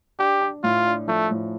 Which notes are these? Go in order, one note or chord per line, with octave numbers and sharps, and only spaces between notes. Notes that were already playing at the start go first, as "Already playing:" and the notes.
D4 G4
D4
A2 F4
D4
F3 A3
A2